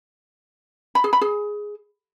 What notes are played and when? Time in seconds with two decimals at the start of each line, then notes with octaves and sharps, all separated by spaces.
0.95 B5
1.04 G#4
1.13 B5
1.21 G#4